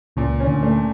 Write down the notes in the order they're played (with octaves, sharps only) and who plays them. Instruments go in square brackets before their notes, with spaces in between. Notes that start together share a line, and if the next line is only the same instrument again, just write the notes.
[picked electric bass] C#2 C#3 [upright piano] A#2
[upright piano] C#4
[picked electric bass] D2 D3
[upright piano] A3